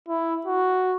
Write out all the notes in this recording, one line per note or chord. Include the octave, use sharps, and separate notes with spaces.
E4
F#4